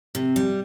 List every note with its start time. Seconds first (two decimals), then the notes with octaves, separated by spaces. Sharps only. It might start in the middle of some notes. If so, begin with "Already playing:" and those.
0.15 C3
0.36 G3